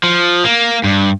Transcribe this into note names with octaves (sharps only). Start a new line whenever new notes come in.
F3
A#3
G2